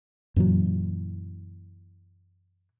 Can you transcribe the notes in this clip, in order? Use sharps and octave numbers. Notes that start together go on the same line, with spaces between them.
F#2 A#2 E3 F#3